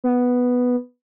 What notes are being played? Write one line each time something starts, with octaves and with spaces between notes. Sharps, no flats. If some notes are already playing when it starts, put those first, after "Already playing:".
B3